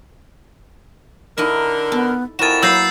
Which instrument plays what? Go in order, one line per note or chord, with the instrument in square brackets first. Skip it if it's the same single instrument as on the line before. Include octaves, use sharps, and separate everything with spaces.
[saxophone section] D3 A#4 [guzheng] D#4 E4 E5
[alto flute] B3 [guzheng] A4
[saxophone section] F2 A#4 [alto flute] E4 [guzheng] F#4 G#5 [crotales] A6 E7
[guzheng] F#3 A#3 B4 [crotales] E6 G6 C7